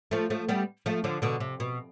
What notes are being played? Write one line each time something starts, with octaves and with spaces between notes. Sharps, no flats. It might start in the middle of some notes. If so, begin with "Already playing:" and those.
F3 A3
F3 A3
G3 B3
F3 A3
D3 F3
B2 D3
C3
B2